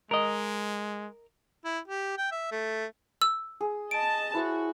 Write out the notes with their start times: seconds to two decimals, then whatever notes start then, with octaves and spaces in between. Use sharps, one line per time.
0.11 G#3 A#4 D#5
1.65 E4
1.88 G4
2.18 G5
2.31 E5
2.52 A3
3.22 E6
3.61 G#4
3.91 D#5 A5 D7
4.34 E4 F#4 C5 C#5